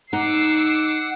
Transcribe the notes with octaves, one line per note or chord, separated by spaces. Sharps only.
D#4 F#5 D6 E6 C7